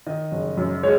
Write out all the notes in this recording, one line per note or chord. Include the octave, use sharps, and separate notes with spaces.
D#3 D#5
F#1
F#2
G#3 C#5